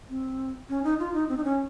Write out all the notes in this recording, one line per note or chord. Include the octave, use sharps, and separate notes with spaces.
C4
C#4
D#4
F4
D#4
C4
D#4
C#4